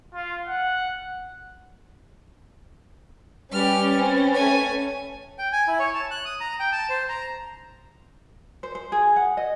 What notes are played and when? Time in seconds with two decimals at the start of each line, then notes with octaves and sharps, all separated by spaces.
0.15 F4
0.47 F#5
3.52 G3 C#4 G4 B4 D5 G5 F6
3.97 C4
4.34 A3 C#5 G#5
5.39 G5
5.52 G#5
5.68 E4
5.80 C#5
5.94 A5
6.11 F#6
6.25 D#6
6.41 A#5
6.60 G5
6.72 A5
6.89 C5
7.09 A#5
8.63 C5
8.75 C5
8.92 G#4
9.16 F#5
9.37 D#5